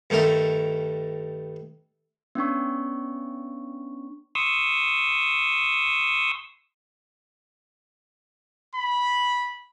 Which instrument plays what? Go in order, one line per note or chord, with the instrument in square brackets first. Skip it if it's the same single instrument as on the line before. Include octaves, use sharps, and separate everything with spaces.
[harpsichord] G2 D#3 A3 D#4 A#4
[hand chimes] B3 C#4 D4 C#6
[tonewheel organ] C6 C#6 D#6 E6
[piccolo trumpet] B5